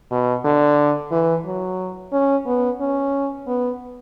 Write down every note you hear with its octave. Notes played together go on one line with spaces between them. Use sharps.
B2
D3
E3
F#3
C#4
B3
C#4
B3